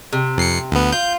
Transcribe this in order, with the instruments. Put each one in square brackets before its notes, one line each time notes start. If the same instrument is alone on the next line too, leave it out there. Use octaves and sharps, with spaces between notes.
[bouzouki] C3
[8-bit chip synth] F2 C7 C#7
D2 B3
[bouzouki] F4 [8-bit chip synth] G6